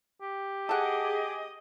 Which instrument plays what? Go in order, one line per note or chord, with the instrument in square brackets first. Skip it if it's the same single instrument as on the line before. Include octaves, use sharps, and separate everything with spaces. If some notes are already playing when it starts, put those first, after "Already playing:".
[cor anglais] G4
[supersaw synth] G#4 D6 [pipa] A4 F#5 [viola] D#5